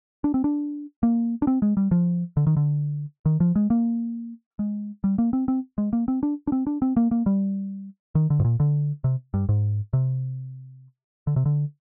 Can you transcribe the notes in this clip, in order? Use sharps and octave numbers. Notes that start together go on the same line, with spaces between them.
D4
C4
D4
A#3
D4
C4
G#3
G3
F3
D3
D#3
D3
D#3
F3
G#3
A#3
G#3
G3
A#3
C4
C4
G#3
A#3
C4
D4
D4
C4
D4
C4
A#3
A#3
G3
D#3
D3
G#2
A#2
D3
C3
G2
G#2
C3
D3
C3
D3